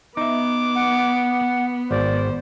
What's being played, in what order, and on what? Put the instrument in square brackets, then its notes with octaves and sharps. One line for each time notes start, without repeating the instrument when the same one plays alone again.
[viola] B3 [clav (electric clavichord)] D#4 E5 [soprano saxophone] D6
[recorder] F#5
[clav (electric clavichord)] G#1 [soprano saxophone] C5 [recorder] D5